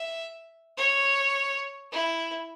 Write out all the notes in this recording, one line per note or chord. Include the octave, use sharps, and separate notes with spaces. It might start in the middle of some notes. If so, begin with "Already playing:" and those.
Already playing: E5
C#5
E4